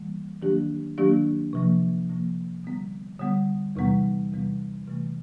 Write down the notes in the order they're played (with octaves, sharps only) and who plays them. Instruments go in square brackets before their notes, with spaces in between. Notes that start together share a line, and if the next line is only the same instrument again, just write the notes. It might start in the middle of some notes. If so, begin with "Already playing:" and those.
Already playing: [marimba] E3 G3 A#3
D#3 F#3 A#3 D4 G4
D#3 F#3 A#3 D4 G4
C3 F3 A#3
C3 F3 A#3
D3 G3 B3
D3 G3 B3
E2 C3 E3 G3 B3
E2 C3 E3 G3 B3
C3 E3 A3